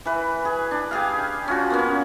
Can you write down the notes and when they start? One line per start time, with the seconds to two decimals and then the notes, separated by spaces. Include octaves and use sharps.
0.05 E3 B4
0.45 G#4
0.71 D4
0.91 G4 G#4 F5
1.48 C#4 F4 F#4
1.70 A#3 B3 C#4